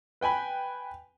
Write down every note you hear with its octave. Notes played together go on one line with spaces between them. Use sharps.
B4 G5 G#5 B5